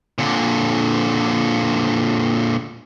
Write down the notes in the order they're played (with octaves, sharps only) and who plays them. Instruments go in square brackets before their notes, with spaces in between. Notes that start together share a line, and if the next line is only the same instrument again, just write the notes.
[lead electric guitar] A#2 D3